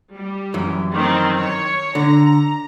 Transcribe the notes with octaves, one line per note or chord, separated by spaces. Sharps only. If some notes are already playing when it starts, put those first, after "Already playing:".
G3
F#2 E3
D#3 C4
C#5
D3 A#5